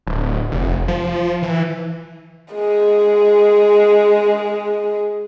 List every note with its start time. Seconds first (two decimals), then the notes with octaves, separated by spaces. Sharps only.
0.07 D1
0.51 F1
0.88 F3
1.42 E3
2.54 G#3 G#4